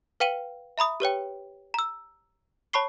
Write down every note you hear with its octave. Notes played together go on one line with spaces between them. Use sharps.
B4 F5 G5 D#7 F#7 G7
E5 A#5 B5 D#6
G4 B4 C#5 G5
A#5 E6
C#5 A5 B5 C#6 C7 G7